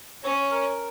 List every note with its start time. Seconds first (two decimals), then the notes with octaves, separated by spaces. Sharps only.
0.23 C#4 C#5
0.51 A#4